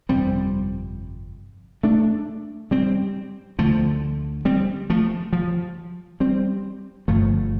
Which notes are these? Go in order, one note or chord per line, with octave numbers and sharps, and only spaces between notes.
G1 F2 C3 G3 C4
A3 D4
G3 C4
D2 D3 F3 A3
G3 C4
F3 A3
F3
G3 C4
G1 G2 D3 F3 A3